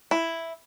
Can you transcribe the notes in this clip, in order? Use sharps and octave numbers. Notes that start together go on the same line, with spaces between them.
E4